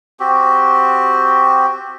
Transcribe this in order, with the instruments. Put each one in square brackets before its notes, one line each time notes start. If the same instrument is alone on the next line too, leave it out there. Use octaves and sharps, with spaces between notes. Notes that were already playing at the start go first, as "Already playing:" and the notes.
[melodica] C4 F#4 G4